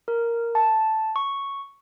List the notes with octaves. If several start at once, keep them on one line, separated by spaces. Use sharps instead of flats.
A#4
A5
C#6